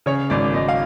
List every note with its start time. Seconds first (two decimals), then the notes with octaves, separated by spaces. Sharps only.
0.06 C#3 C#5
0.30 G#1 D5
0.54 G#1 D#5
0.68 F5